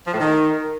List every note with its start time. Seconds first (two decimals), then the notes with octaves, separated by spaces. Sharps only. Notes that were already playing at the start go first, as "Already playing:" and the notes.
0.07 F3
0.13 A2
0.20 D#3